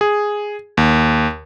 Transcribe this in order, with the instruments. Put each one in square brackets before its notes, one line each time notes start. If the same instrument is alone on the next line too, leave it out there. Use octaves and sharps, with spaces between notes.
[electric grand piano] G#4
D#2